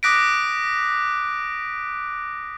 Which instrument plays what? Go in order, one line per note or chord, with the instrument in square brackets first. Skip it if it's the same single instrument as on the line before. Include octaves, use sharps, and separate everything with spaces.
[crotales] D6 D#6 F#6 A#6 B6 D7